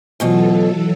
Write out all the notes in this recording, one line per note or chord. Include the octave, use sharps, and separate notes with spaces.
D2 B2 E3 F#3 F4 A4